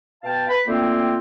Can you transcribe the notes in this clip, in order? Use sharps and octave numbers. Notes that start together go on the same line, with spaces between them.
B2 F5 G5 A5
B4 B5
D2 A#3 C4 F4 G5 C6